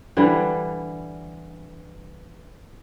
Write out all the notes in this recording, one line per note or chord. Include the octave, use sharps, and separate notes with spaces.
D3 E3 G3